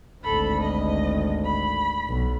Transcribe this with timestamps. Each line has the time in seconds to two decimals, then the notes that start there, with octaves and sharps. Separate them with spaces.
0.23 G#1 D2 A4 B5
0.61 D#5
1.44 B5
2.07 B1